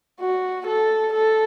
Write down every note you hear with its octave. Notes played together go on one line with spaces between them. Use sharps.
F#4
A4
A4